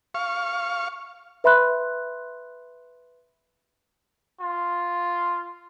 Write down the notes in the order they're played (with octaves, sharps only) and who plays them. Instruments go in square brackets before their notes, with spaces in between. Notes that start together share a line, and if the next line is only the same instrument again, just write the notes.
[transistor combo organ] F5 C#6
[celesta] B4 E5 B5 C6 F#6
[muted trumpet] F4